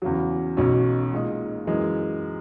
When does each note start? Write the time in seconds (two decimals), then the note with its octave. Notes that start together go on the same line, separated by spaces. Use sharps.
0.02 E2 C#3 F#3
0.57 B1 B2 F#3 C#4
1.13 A#2 G#3 D#4
1.67 F#2 E3 G#3